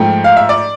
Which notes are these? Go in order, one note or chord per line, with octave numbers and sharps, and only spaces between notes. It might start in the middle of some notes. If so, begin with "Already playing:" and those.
Already playing: G#2 F3 A3 G5
F5
E5
D5